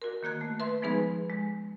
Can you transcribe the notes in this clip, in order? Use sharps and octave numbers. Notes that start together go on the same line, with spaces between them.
F#4 A#4
D#3 A#3 F#6 G#6
A3
B4 E5 C6
F3 G#3 B3 D#4 G#4 B4
G#3